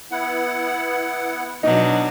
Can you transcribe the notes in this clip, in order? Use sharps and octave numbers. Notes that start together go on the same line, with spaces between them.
B3 E4 F#5
B2 F#3 D4 D#4